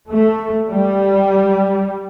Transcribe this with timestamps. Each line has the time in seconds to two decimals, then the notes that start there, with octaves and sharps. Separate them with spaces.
0.11 A3
0.70 G3